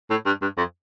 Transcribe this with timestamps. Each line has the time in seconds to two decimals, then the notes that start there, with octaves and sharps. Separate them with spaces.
0.10 A2
0.26 G2
0.41 G2
0.57 F2